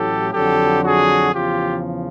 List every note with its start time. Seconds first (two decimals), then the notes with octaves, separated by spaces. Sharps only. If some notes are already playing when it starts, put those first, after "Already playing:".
Already playing: A1 A2 F#3 G4 A4
0.33 F2 D3 F#3 G4 A4
0.83 F#4 G#4
1.33 E2 C#3 F3 F4 G4